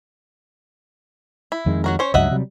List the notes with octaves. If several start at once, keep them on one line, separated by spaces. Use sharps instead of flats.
E4
F2 D#3 G#3
F#3 F#4 A#4
C#4 C5 C#5
C#2 G2 F#3 D#5 E5 F#5
C3 F#3 G3